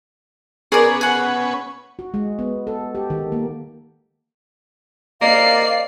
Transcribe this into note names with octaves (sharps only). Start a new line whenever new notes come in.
B3 C#4 G#4 A#4 D5
G#4 F#5
F#4
G#3
B3
A4
G4
D#3
A#3
A#3 A#4 C5 D5 D#5 F5 C7